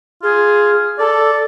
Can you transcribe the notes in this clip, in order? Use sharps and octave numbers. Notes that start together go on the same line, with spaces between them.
F4 G#4
A4 D5